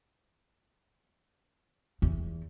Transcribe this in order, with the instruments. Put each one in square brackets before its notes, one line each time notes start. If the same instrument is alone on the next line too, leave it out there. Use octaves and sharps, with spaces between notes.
[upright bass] E2